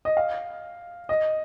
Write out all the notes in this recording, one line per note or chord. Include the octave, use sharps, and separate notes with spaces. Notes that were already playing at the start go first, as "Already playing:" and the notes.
D#5
F5
D#5